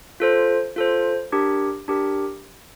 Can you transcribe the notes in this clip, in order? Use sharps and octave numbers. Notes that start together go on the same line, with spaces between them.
F4 A4 C5
F4 A4 C5
D4 G4 A#4
D4 G4 A#4